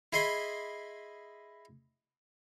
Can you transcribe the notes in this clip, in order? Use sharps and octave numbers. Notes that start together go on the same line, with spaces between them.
E4 G#4 D#5 B5 C6